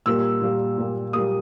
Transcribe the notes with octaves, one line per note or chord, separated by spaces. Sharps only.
A#2 G3 A#3 E6
A#2 G3 A#3
A#2 G3 A#3
A#2 G3 A#3 D#6